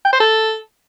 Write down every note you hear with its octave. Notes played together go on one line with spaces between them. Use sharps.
G5
C5
A4